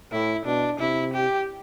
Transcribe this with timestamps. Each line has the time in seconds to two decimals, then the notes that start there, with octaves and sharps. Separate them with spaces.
0.12 A2 E4
0.45 B2 D4
0.80 C3 E4
1.13 G4